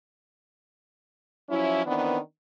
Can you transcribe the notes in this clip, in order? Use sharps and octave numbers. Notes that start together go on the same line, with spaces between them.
F3 F#3 C#4 E4
D#3 E3 B3 C4 D4